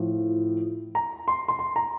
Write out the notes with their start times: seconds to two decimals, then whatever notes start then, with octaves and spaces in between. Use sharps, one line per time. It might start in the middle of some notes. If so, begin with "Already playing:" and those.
Already playing: A2 F3
0.95 A#5
1.28 C6
1.48 C6
1.59 C6
1.76 A#5